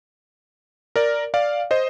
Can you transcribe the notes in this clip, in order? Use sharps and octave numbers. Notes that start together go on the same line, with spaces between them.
A#4 D5
D5 F5
C5 D#5